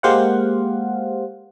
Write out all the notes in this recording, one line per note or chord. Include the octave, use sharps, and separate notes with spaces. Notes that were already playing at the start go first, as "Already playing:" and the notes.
G#3 A#3 G4 C5 F5 F#5